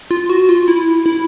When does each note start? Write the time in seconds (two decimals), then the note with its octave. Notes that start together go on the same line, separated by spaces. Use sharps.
0.11 F4
0.30 F#4
0.49 F4
0.68 E4
1.06 E4